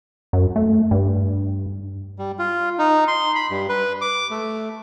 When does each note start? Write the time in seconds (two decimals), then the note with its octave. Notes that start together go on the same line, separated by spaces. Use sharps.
0.33 F#2
0.56 A3
0.91 G2
2.19 G3
2.39 F4
2.79 D#4
3.08 C6
3.35 B5
3.50 G2
3.69 B4
4.01 D6
4.31 A3